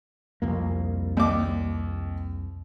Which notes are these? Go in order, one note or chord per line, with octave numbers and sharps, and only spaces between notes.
C2 F2 A#3
D#2 D6